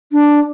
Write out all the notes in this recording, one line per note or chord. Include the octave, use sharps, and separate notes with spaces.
D4